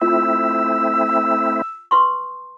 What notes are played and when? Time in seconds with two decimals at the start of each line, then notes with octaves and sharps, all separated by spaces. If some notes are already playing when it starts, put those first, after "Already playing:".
0.01 A3 C4 E4 F4 E6
1.91 B4 C6 C#6